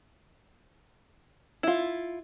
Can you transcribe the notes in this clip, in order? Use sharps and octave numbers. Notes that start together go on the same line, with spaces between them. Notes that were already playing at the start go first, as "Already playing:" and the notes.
E4 F4